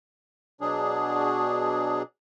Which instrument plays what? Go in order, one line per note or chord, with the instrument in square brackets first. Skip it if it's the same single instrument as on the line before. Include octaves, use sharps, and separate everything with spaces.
[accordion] B2 F#3 D4 G#4